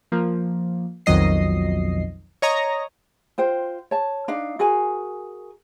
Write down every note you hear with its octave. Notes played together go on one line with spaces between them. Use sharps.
F3 A#3
B1 F2 D#3 F#3 D#5 C7
C#5 D#5 A#5
F4 C5 G5
C#5 A5
D4 D#4 F5
F#4 G#4 A#4 G#5